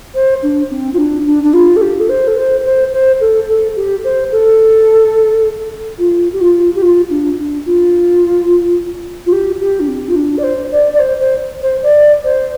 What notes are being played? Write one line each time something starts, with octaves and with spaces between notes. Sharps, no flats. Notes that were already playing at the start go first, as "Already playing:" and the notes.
C5
D4
C4
F4
D4
D4
D4
F4
A4
G4
A4
C5
A4
C5
C5
C5
A4
A4
G4
C5
A4
F4
G4
F4
G4
F4
D4
D4
F4
F4
G4
G4
D4
C4
F4
D4
D5
C5
D5
D5
C5
C5
C5
D5
C5